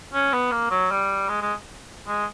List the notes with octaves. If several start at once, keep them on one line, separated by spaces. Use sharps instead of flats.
C#4
B3
A#3
F#3
G3
G#3
G#3
G#3